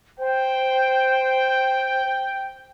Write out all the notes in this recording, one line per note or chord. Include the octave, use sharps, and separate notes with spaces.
C5 G5